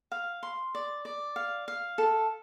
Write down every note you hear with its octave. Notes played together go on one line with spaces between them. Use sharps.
F5
C6
D5
D5
F5
F5
A4